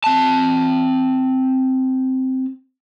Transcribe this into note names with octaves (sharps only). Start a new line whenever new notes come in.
C4 A5